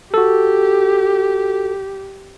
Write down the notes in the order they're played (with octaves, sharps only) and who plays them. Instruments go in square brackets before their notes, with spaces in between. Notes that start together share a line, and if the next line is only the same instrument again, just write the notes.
[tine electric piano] F#4 A4 [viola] G4